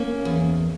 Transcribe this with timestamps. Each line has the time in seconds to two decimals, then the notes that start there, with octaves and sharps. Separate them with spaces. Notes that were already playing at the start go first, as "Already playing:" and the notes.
Already playing: A#3 C#4
0.25 E2